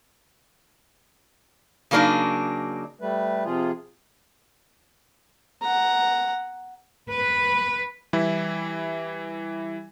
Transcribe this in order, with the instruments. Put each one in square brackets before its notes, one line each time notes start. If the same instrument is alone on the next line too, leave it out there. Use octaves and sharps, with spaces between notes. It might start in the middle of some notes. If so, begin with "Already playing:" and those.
[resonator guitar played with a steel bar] C#3 F#3 A#3 D4 D#4
[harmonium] G3 A3 B4
C3 F3 F4 G#4
[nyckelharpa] F#5 A#5
[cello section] B4
[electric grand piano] E3 G3 E4